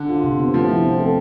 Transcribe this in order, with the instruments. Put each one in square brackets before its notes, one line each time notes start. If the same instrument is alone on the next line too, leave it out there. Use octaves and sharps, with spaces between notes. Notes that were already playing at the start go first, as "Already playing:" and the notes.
Already playing: [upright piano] D3
[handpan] F4
C3
B3
[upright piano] F3 [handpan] A3
[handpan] E4
C4
A4